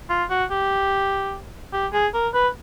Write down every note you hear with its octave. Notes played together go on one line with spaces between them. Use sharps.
F4
F#4
G4
G4
G#4
A#4
B4